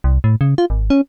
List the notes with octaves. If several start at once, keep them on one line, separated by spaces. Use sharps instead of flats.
C2
A2
C#3
F4
G#1
C#4